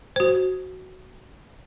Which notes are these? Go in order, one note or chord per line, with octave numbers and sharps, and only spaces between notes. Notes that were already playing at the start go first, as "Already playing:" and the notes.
F#4 C5